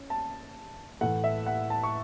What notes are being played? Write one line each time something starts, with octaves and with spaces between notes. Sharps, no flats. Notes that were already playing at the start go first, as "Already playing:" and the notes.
Already playing: C#4
A5
A2 E3 A3 F#5
E5
F#5
A5
C#6